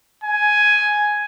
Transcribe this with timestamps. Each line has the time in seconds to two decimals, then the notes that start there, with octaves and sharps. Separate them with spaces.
0.24 G#5